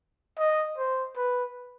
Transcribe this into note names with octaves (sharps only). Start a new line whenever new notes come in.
D#5
C5
B4